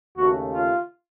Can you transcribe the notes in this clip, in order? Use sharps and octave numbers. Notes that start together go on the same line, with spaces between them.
D#2 C#3 A3 F#4
F4